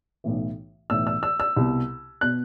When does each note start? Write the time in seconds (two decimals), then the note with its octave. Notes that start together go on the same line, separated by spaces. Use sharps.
0.24 B1 A2 E3
0.90 B1 A2 E3 E6
1.07 E6
1.23 E6
1.40 E6
1.57 C2 B2
2.21 B2 F#6